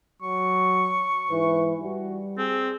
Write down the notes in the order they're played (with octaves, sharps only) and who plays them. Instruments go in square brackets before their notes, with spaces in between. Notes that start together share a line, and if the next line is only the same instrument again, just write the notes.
[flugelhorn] F#3 [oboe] C#6
[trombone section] G#2 E3 [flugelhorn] B4
[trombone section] G3 [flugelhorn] F#4
[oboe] C4 [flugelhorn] G#4